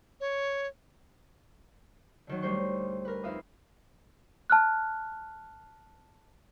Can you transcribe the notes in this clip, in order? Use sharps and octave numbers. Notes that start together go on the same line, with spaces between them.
C#5
D3 D#3 F#3
D2 G3 A#4 C5 C#6
A#4 B4
F2 D#4 F4 E5 F5 D#6
A5 F6 F#6